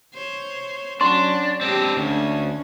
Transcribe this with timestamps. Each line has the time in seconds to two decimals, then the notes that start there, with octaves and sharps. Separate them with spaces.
0.14 C5 C#5
1.01 F#3 C#4 D4 F#4 C6
1.61 G#3 C4 D4 G4
1.97 D2 C#4 D4